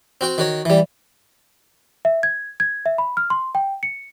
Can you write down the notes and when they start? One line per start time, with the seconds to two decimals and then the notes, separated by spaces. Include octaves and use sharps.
0.21 C4 F#4 G5
0.38 D#3 F#4 C#5
0.65 E3 G3
2.05 E5
2.23 G#6
2.60 G#6
2.86 E5
2.98 B5
3.17 F6
3.30 C6
3.55 G5
3.83 C#7